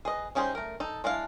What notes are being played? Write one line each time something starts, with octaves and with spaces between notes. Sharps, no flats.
G#4 B4 D#5
G3 C#4 D#4 G#4 C5
A3 A#4
D#4 A4
G#3 D4 E4 F5